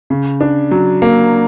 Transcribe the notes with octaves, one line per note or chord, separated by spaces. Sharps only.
C#3
D4
F#3
A#3